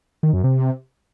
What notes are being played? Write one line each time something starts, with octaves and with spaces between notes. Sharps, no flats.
D#3
F#2
C3